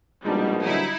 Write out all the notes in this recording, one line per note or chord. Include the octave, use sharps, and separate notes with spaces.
A#1 B2 G3 G#3 D#4 A5
D3 F#3 G3 D#4 E4